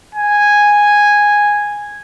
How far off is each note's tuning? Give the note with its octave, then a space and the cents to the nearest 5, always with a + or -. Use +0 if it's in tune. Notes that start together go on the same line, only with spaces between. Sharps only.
G#5 -5